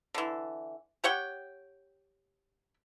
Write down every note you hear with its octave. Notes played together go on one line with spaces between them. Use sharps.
D3 E3
G4 C#5 F#5 G5